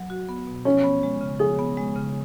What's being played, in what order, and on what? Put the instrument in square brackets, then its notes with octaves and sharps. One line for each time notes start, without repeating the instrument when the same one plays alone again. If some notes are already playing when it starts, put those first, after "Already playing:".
Already playing: [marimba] F#3
F#4
B3
B2
[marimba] F3 [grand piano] C#4
[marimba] B3
G#3
C#3
[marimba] F3 [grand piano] G#4
[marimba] B3
G#3
C#3